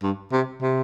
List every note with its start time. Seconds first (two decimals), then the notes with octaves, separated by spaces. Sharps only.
0.03 G2
0.32 C3
0.62 C3